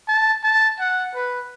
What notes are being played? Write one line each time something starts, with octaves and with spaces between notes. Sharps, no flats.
A5
A5
F#5
B4